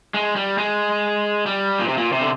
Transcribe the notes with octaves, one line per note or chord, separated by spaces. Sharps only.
G#3
G3
G#3
G3
A#2
C3
A#2
C3
D3